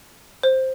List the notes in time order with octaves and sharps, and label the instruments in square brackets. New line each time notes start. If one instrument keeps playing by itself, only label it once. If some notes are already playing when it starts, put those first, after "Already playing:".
[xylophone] C5